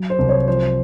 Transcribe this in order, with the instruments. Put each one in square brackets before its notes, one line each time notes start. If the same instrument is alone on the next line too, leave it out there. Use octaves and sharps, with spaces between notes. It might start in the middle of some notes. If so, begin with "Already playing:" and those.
Already playing: [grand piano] F#3
C5
C2
C#5
F3 C5